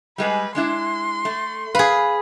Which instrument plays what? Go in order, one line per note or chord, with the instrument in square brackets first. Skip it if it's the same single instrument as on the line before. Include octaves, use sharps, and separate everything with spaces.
[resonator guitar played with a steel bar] G3 G#3 G#4 [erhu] B4
[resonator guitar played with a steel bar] G#3 D4 E4 [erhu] C6
[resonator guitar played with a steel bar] A3
[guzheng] G#4 B4 [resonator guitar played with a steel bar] F5